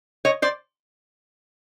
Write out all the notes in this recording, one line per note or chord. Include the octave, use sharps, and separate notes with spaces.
C#5 D#5
C5 D5